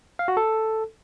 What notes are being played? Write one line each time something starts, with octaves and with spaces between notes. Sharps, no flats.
F5
F#4
A4